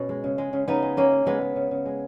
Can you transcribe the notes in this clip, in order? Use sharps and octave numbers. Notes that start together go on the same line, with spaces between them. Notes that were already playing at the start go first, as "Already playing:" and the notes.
Already playing: B2 C#4
G#3
C#3
G#3
C#3
C#3 B3 D#4
G#3
G#3 A#3 C#4
G#3
C#3 G#3 B3
G#3
C#3
C#3
G#3